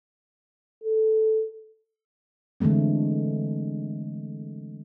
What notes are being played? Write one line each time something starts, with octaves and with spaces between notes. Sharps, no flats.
A4
D3 E3 G#3 A3 C4